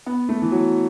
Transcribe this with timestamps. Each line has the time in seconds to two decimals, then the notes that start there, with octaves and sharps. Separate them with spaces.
0.06 B3
0.29 A3
0.42 E3
0.52 F#3